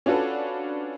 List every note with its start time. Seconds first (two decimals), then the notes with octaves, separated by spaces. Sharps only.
0.06 C#4 D4 F4 F#4 A4 B4